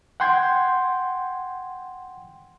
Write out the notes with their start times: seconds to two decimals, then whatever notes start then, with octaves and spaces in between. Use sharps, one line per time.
0.20 F#5 G5 C6 G6 G#6